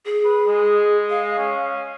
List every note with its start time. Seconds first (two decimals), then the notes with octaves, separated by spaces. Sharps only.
0.06 G#4
0.25 B4
0.46 G#3
1.10 F5
1.37 C#4